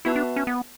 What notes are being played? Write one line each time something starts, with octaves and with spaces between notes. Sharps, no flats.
B3 E4 F#4 B4 E5 A5
D4
C#4
B3